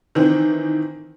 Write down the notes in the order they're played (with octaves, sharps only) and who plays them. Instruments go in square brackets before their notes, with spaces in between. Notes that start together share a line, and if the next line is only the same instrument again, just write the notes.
[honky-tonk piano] D#3 E3 C4